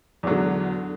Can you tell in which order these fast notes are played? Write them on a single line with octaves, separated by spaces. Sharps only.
E2 F#3 D3